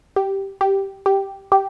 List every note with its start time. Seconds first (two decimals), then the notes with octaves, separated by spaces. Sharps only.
0.16 G4
0.61 G4
1.06 G4
1.52 G4